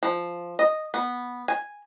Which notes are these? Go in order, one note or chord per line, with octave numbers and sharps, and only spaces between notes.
F3
D#5
B3
G#5